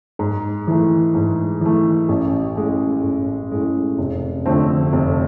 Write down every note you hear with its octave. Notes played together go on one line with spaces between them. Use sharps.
G#2
E3 A3
G#2
E3 A3
A1
A2 G#3
A1
A2 G#3
F1
F2 D3 A3 C4
F1